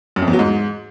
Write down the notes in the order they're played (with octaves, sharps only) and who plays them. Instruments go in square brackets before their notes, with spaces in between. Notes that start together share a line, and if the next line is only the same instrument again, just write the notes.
[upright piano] F#2
F2
E2
F#3
G#2